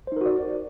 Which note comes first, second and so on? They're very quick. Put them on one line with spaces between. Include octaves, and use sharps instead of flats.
C5 D#4 A#4 F#4 D5